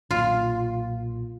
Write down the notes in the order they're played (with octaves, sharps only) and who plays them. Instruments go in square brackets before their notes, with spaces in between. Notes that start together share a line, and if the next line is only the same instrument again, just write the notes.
[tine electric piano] B1 A#2 [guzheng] F4